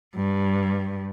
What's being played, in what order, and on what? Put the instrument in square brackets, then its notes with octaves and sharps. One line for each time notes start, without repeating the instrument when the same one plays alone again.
[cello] G2